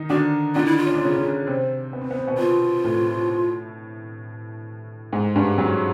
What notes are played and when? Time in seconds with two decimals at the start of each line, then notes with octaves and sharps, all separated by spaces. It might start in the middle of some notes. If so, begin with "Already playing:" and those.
Already playing: D#3 D#4
0.10 D3 D4 F#4
0.55 D3 D4 F4
0.66 E4
0.77 F4
0.86 C#4
0.95 D4
1.05 C#3 C#4
1.16 C#3 C#4
1.47 C3 C4
1.93 B3
2.01 C4
2.11 B3
2.19 C4
2.27 B2 B3
2.38 B2 B3 F4
2.84 A2 A3
5.13 G#2 G#3
5.36 G2 G3
5.58 F#2 F#3